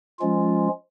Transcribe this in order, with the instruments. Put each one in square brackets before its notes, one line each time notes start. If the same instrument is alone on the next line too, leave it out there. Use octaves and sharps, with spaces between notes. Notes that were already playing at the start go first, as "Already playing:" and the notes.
[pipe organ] F3 G#3 C#4 F4